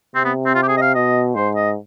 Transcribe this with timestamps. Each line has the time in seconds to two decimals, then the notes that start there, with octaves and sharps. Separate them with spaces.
0.15 C3 C4
0.25 B3
0.45 C4
0.55 F4
0.63 G4
0.68 G#4
0.77 D#5
0.82 F5
0.95 B2 D#5
1.35 G#2 C5
1.56 D#5